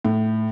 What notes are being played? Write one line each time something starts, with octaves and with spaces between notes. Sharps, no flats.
A2